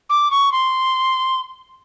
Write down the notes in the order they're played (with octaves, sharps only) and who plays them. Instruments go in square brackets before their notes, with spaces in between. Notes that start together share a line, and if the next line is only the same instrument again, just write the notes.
[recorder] D6
C#6
C6